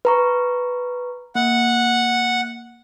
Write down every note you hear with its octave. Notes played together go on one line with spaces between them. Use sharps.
B4 A#5 C#6
A#3 F#5